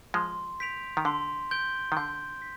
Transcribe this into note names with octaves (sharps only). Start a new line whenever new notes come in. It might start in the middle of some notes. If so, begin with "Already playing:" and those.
F3 G#3 C6
G6 B6 D7 F7
D#3
D3 C6
G6 D7 G7
D#3
D3 G6
B6